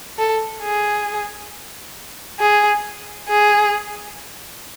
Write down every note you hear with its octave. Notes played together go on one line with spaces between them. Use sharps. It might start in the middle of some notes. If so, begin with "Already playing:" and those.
A4
G#4
G#4
G#4